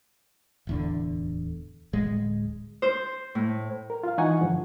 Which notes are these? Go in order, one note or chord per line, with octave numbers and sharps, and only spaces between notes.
D1 E2 D3
D1 G#3
C5
A2
A#4
F4 F5
E3 D#4 E4 F#5 G#5 C#6
G2 D3 F3